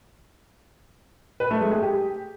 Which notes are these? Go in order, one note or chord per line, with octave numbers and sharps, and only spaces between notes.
B4
A3
G#3
G#4
G4